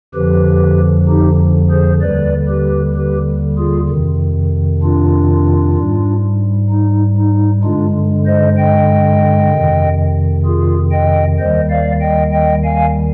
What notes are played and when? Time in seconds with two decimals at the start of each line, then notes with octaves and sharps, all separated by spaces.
0.14 F2 D3 F3 G4 B4
1.08 D#4 G4
1.70 G#4 C5
2.02 D#2 D3 G3 B4 D5
2.49 G4 B4
2.96 G4 B4
3.58 F4 G#4
3.89 F2 C3 D#3
4.83 D4 F4
5.77 G#2 G3
6.70 D#4
7.18 D#4
7.64 G2 D3 G#3 D4 F4
8.26 C5 D#5
8.58 D#5 G5
9.52 F2 C3 D#3
10.45 F4 G#4
10.92 D#5 G5
11.39 D#2 D#3 G3 C5 D#5
11.70 D5 F5
12.01 D#5 G5
12.33 D#5 G5
12.64 F5 G#5